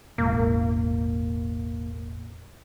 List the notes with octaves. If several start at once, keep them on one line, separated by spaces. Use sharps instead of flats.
E1 A1 G#3 A#3